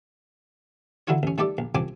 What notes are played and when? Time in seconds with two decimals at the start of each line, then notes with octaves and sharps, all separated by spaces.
1.07 D3 F#3 E4 F4 C#5
1.23 A1 C#4
1.38 D#3 G3 A3 G4 A4 D5
1.58 A#1
1.75 C2 F3 C4 G#5 D6